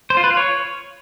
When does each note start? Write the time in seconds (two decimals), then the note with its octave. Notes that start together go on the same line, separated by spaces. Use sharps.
0.10 C5
0.17 F4
0.24 B4
0.30 F4
0.37 C#5